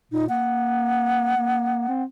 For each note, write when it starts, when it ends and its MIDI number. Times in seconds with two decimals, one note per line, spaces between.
0.12 0.26 46
0.12 0.25 63
0.29 1.35 58
0.29 2.02 78
1.37 1.87 58
1.88 2.04 60